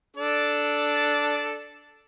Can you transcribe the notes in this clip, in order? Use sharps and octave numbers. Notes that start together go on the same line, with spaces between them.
D4 A4 D5